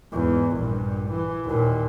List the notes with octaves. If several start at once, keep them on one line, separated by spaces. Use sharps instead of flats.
E2 G#2
A#1 G2
E3
D#2 A#2